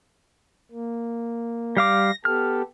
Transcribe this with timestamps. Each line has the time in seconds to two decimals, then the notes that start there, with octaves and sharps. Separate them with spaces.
0.71 A#3
1.77 G3 F5 D6 A#6
2.25 B3 G4 A4 F6